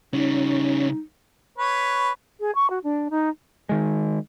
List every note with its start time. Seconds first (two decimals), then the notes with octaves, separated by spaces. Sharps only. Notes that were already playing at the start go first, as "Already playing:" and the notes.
0.13 C#3 G3 C#4 D#4
1.58 B4 C#5
2.40 G#4
2.55 C#6
2.70 F#4
2.84 D4
3.10 D#4
3.69 D#3 G#3